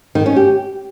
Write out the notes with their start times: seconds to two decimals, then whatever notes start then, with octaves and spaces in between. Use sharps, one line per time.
0.15 D#3
0.26 C#4
0.36 G4